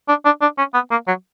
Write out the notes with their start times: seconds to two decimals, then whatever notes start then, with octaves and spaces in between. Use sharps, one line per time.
0.08 D4
0.25 D4
0.42 D4
0.58 C#4
0.74 B3
0.91 A#3
1.07 F#3